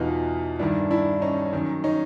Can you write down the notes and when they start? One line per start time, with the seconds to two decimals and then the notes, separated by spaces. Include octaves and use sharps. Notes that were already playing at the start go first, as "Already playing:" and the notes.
Already playing: E2 B2 D#4 F4
0.59 G2 D#3 D4 E4
0.91 D4 E4
1.22 C#4 D#4
1.53 F#2 D#3
1.84 C#4 D#4